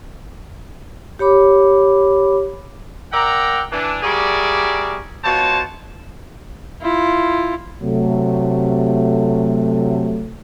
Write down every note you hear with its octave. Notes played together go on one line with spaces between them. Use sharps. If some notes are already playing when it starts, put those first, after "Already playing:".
G4 C#5 B5 D6
A#4 D5 E5 F#5 G5 A#5
E3 D4
G3 F#4 G#4 A#4 D5 E5
B2 F4 C5 C#5 A5
E4 F4
C3 F#3 A3